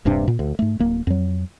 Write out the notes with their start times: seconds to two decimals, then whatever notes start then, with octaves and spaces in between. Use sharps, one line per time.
0.05 D#1 G2 C3 D4
0.28 A#2
0.39 D2
0.59 G#2 A3
0.79 D1 A#3
1.07 F2 F#3